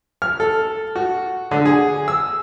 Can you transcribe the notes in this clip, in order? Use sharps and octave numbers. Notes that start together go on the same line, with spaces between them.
F6
A4
F#4
D3
G#4
E6